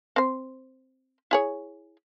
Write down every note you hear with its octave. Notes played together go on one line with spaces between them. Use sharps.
C4 C5
E4 G#4 C#5